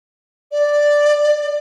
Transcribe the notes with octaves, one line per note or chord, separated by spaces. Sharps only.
D5